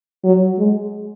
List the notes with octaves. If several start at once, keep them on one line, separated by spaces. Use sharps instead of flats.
F#3
G#3